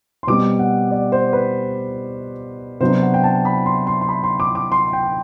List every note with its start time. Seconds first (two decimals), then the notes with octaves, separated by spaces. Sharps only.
0.23 C6
0.27 B2 G3 C4 D6
0.59 F#5
0.91 D5
1.12 C5
1.33 B4
2.81 C3 F#3 B3 D4 C5
3.02 F#5
3.14 G5
3.24 A5
3.45 B5
3.66 C6
3.87 C6
4.01 C6
4.09 B5
4.24 C6
4.40 D6
4.55 D6
4.72 C6
4.93 G5